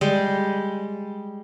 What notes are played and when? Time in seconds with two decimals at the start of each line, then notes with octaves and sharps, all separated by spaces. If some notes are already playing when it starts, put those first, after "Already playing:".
0.01 G3 G#3